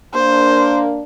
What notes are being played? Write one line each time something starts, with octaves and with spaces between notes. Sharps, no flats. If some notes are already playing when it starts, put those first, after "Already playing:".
A#3 D4 C5